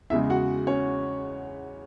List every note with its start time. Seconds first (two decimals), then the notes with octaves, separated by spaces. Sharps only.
0.10 E2 C#3 G#3 E4 E5
0.30 F#4 F#5
0.67 C#4 C#5